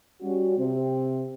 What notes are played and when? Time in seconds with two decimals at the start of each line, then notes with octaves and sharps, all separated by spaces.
0.21 G3 C#4 F#4
0.57 C3 C4